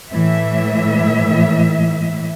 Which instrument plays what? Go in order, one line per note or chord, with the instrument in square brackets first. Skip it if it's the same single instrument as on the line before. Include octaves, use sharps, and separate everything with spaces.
[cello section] A2 E3 E5